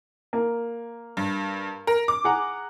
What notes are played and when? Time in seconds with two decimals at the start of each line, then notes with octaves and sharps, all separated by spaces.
0.33 A#3
1.17 G2
1.87 A#4
2.08 D6
2.24 G#4 F#5 A#5